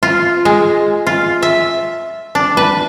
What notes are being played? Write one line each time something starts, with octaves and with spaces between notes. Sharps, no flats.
F4
G#3
F4
E5
D4
B4